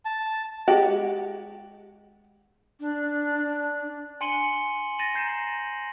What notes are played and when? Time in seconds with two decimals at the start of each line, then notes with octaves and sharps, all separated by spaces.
0.05 A5
0.68 G#3 F#4 G4
2.81 D4
4.21 G#5 C6 C#7 D#7 F#7 G7
4.99 A6 A#6 D#7 E7 F#7
5.14 A#5 G6 C7 D#7 E7